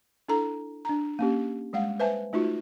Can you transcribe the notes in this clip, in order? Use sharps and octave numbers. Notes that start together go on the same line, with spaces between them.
D4 E4 A4 A#5
D4 A#5
A#3 C#4 G4
G3 G#3 F5 F#5
B4 C5 E5 G#5 A5
A3 D#4 F4 F#4